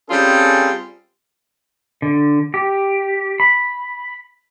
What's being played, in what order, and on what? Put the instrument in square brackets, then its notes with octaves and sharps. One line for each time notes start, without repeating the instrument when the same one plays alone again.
[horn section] G3 C4 C#4 F4 G#4 A4
[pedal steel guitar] D3
G4
B5